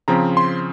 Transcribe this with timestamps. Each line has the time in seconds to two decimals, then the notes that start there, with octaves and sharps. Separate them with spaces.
0.08 C#3 F3 C4 A#5
0.37 C6